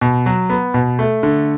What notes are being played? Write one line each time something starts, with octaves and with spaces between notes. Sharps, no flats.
B2
F#3
B3
B2
A3
D3